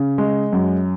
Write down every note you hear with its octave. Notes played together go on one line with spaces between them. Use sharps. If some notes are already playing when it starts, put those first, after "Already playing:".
Already playing: C#3
G#3
F#2